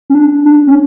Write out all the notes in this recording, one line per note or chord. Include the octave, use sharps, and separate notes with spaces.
C#4
D4
D4
C#4